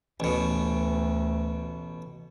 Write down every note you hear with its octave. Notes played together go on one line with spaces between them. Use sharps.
A1 D2 B2